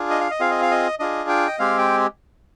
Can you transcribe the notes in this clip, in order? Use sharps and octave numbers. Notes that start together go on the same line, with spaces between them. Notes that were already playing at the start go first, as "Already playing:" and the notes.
Already playing: D4 F4 G#4
D#5
F5
D#5
C4 F4 G#4 F5
D#5
F5
D#5
D4 F4 G#4 D#5
G5
D#5
G#3 C4 G4 F5
G5